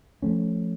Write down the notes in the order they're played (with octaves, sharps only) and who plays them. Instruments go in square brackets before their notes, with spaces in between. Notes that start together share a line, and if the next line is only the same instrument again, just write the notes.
[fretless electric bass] F3 A3 C#4